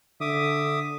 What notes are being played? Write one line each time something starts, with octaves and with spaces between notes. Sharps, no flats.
D3 E5 D6 D#6